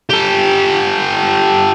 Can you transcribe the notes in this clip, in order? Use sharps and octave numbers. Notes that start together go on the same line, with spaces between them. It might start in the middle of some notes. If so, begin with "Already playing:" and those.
G4 A4